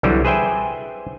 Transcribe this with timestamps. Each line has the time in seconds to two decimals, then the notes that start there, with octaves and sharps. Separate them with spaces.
0.03 C2 D3 E3 F#3 G3
0.25 G#4 B4 C5 E5 G5 G#5